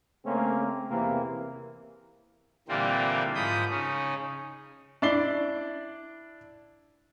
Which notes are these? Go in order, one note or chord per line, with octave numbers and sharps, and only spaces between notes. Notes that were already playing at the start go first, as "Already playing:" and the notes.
C#3 A3 A#3 C4 C#4
E2 C3 E3 A#3
A#2 D3 E3 G3 A#3 C4
G#2 F3 B5 D#6 G6
C#3 C#4 D#4
D4 E4 D5 C7 G7